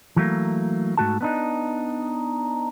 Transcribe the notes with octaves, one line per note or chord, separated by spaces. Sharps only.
E3 F#3 A3 A#3
G#2 G#3 A3 F#4 A4 A5
B3 D4 D#4